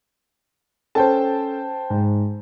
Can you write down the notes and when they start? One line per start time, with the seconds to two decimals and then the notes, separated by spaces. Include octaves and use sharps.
0.95 C#4 A4 C5 G5 A5
1.90 G#2